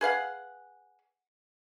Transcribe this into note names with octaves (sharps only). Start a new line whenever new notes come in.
G#4 B4 F5 F#5